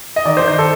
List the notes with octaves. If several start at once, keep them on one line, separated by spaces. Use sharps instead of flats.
D#5
D#3 D5
C5
D#3
C5
A4